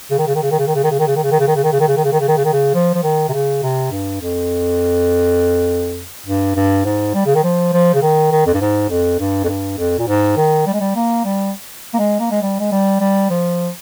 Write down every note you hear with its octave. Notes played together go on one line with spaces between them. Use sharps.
C#3
D#3
C#3
D#3
C#3
D#3
C#3
D#3
C#3
D#3
C#3
D#3
C#3
D#3
C#3
D#3
C#3
D#3
C#3
D#3
C#3
D#3
C#3
D#3
C#3
D#3
C#3
D#3
C#3
D#3
C#3
F3
F3
D#3
C3
C#3
C3
G2
F2
G2
G2
G#2
G3
C#3
D#3
F3
F3
C#3
D#3
D#3
F2
G2
G#2
F2
G2
F2
G2
F2
A#2
G#2
D#3
G3
G#3
G3
A#3
G3
A#3
G#3
A#3
G#3
G3
G#3
G3
G3
F3